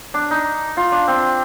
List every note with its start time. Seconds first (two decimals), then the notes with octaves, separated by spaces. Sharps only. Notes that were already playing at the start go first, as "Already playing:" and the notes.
0.14 D4
0.31 D#4
0.77 F4
0.92 D4
1.08 C4